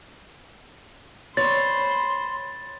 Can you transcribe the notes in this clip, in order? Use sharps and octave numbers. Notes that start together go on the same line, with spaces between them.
C5 C#5 B5 C6 A6